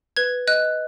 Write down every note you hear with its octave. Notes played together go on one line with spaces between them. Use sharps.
B4 G#6
D#5 F#6